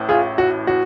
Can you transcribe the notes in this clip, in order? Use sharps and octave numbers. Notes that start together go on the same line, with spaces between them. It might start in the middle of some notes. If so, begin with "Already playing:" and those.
Already playing: A1 A2
F4 G#4
F#4
F#4